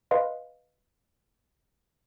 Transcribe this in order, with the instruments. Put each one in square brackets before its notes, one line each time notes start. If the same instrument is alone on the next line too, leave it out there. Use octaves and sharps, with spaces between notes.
[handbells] B4 D#5 F5 C6